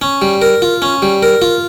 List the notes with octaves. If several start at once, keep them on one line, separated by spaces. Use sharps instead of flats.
C#4
G3
A#4
F4
C#4
G3
A#4
F4